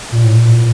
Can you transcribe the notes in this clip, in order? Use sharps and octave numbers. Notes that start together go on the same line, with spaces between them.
A#2
A2
A#2